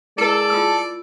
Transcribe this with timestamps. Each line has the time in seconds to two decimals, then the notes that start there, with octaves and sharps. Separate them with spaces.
0.18 G#3 E4 A4 A#4 D5
0.50 F4 D#6 E6